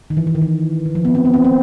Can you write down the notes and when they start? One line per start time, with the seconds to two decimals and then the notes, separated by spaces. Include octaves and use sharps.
0.10 D#3
0.17 E3
0.27 E3
0.35 D#3
0.42 E3
0.86 D#3
0.95 F3
1.05 B3
1.15 C4
1.25 B3
1.34 C4
1.44 C4